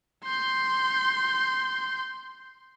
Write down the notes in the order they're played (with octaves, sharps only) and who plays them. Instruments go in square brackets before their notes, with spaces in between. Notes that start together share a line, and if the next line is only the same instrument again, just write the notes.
[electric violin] C6 G6